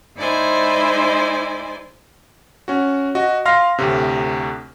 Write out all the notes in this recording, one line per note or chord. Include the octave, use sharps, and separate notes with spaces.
G#3 D#4 E4 C5 D5 G#5
C#4 F#4
F#4 D#5
F5 C6 F6 A#6
D2 A2 C3